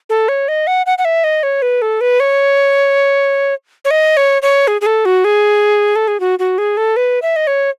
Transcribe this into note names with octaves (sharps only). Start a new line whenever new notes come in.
A4
C#5
D#5
F#5
F#5
F#5
E5
D#5
C#5
B4
A4
B4
C#5
C#5
D#5
C#5
C#5
G#4
G#4
A4
F#4
G#4
A4
G#4
F#4
F#4
G#4
A4
B4
E5
D#5
C#5